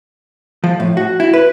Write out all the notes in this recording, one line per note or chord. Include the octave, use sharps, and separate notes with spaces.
F3
A2
F#4
E4
B4